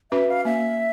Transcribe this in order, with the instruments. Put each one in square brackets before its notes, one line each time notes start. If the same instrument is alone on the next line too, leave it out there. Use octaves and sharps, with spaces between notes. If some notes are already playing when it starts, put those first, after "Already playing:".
[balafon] C#4 F#4 B4 [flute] E5
[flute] F5
[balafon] A#3 [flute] E5